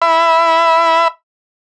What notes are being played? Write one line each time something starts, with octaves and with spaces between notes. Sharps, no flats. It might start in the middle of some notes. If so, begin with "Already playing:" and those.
E5 B5